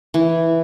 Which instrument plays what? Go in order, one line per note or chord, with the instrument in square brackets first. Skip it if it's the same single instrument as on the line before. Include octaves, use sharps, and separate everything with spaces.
[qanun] E3